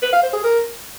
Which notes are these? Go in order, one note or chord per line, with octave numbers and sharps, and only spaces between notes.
B4
F5
C5
G#4
A#4